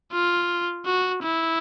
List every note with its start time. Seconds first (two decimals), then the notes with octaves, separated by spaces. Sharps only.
0.12 F4
0.86 F#4
1.23 E4